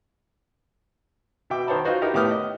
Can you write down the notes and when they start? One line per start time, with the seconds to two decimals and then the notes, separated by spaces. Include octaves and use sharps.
1.50 B2 E5 G5 D6
1.67 D#3 C5 C#5 A5 B5
1.85 D#4 F4 F#4 C5
2.01 D#4 E4 G4 A#4
2.14 A2 B3 G4 D6 D#6 F6
2.31 D#5